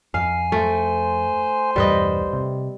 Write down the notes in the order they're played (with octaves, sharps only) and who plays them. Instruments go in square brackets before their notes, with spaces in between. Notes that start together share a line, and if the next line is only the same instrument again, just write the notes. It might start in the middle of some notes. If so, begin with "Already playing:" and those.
[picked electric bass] F2 [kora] F5 [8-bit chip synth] G#5
[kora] A3 [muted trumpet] C5
[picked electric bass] B1 E2 G2 [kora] G3 B4 D#5
[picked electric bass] C3